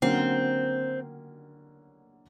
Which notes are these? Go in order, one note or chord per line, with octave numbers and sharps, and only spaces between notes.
D3 F#3 A#3 C4 C#4